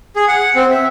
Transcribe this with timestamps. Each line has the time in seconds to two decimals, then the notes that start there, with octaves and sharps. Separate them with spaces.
0.16 G#4
0.28 F#5
0.55 C4
0.70 E5